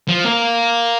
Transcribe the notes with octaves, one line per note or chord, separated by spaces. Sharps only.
F3
A#3